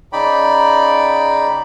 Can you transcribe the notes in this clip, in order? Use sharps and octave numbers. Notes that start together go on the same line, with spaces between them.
C#3 D#4 D5 G5 B5